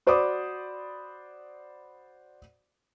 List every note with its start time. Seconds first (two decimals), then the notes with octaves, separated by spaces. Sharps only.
0.07 F#4 C5 D5 B5 D6 D#6